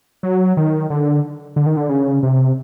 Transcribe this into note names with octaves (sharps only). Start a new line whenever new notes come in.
F#3
D#3
D3
D3
D#3
D3
C#3
C3